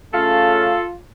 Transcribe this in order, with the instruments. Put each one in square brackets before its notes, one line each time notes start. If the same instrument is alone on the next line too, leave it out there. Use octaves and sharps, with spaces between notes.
[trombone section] C#3 A3 C#4 [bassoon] F4 [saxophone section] A4 [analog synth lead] F5